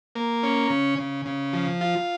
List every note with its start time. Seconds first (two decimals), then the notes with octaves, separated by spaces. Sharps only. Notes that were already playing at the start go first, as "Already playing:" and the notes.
0.16 A#3
0.43 C#4
0.70 C#3
0.98 C#3
1.26 C#3
1.53 F3
1.81 F4